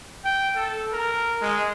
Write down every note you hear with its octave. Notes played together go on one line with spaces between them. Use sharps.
G5
A4
A#4
G#3